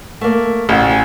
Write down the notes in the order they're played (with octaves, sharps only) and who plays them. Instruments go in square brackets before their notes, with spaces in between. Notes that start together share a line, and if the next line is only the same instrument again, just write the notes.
[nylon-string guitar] A3 A#3
[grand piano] A1 [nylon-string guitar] C#3 F#4
[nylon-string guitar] G#5